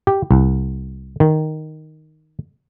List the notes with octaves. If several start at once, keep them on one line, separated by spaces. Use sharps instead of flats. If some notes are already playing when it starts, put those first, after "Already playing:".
G4
C2
D#3